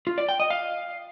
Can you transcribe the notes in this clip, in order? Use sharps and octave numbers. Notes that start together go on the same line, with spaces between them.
F4
D5
G5
D#5
F5